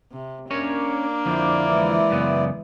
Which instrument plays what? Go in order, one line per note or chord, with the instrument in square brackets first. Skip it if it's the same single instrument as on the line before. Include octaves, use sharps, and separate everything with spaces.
[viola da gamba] C3
[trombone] A#3 [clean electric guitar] C#4 A#4 C#5 [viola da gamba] D4
[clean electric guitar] F2 D3 F3 [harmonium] E4 D5
[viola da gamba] E3 G#3
[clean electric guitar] F#2 C#3 B3